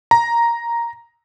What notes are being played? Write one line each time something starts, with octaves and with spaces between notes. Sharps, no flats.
A#5